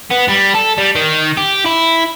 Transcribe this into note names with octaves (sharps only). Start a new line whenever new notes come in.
B3
G3
A4
G3
D#3
G4
E4